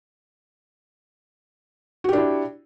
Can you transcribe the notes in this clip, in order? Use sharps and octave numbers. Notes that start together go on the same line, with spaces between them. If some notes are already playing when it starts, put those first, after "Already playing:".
D4 E4 F#4 G4